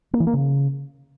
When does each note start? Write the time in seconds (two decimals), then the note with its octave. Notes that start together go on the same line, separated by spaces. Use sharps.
0.13 A#3
0.20 E3
0.27 A#3
0.33 C#3